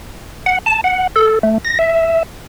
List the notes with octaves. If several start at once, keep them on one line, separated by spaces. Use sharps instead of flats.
F#5
A5
F#5
A4
A3
A#6
E5